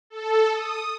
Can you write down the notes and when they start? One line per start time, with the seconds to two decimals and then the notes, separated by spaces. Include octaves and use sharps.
0.10 A4
0.52 D#6